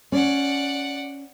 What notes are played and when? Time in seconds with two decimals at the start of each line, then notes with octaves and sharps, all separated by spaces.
0.12 C#4 D5 F#5